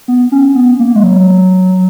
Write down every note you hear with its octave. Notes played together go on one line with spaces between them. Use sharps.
B3
C#4
B3
A#3
G#3
F#3